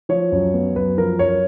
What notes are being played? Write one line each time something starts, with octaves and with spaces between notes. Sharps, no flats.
F3 C#5
F#2
B3
F#2 B4
F3 A#4
F#2 C#5